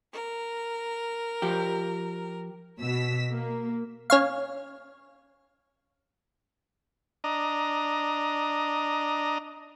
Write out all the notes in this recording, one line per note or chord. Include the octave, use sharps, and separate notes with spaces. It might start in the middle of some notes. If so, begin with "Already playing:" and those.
A#4
F3 G4
B2 E6 B6
A#3
C#4 C#5 F5
D4 D#5 A#5